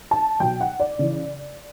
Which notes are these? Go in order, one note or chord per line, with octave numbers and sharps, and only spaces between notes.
A5
B2 F#3 G5
F#5
D5
C#3 E3